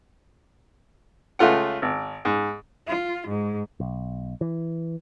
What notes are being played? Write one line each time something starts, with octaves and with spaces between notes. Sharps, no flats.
C#2 A3 F4 F#5
G#1
G#2
F4
G#2
B1
E3